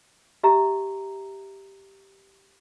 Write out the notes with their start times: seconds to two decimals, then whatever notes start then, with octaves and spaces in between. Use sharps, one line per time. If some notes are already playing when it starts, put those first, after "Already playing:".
0.43 G4 E5 A#5